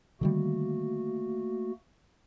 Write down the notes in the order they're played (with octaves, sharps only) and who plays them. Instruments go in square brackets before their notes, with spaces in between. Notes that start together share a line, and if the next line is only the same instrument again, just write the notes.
[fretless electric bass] D3 D#3 G3 [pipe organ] A3 A#3 F#4